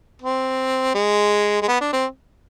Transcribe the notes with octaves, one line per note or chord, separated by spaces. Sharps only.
C4
G#3
G#3
B3
D4
C4